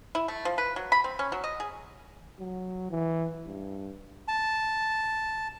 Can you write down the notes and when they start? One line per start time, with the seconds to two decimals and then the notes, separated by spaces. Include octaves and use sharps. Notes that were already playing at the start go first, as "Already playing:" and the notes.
0.15 E4
0.28 A3
0.45 F3
0.58 B4
0.76 F#3
0.92 B5
1.04 C4
1.19 C#4
1.32 F#3
1.44 D#5
1.60 G#4
2.40 F#3
2.91 E3
3.46 G2
4.28 A5